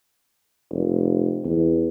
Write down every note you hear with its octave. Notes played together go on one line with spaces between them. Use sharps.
F1
E2